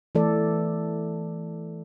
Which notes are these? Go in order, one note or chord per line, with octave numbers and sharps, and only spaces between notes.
E3 A3 A4 D5